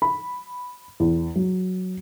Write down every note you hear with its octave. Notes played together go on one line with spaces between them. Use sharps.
B5
E2
F#3